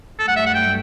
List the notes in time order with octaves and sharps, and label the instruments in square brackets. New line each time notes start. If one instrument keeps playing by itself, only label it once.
[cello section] G2 F#3 A3 [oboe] A4
[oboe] F#5
E5
F#5
G5